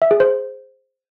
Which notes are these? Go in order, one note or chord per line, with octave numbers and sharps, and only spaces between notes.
E5
G#4
C5